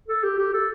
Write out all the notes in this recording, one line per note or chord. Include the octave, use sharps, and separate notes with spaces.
A4
G4
G4
A4